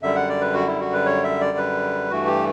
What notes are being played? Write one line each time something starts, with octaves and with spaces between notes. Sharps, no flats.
F#2 D3 G3 E5
F#5
D5
B4
F#4
E4
F#4
B4
C#5
E5
D5
B4
G2 E3 A3 F#4
G4